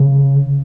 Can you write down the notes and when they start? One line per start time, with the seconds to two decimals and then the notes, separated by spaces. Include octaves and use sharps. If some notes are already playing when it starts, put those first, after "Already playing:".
Already playing: C#3